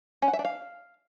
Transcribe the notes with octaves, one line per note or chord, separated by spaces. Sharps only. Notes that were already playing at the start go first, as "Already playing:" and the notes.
C#4
F#5
E5
D4
F5